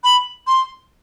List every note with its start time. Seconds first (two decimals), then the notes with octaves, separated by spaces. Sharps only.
0.04 B5
0.47 C6